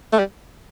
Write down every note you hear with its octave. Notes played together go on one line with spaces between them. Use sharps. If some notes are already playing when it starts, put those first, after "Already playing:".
A3
G3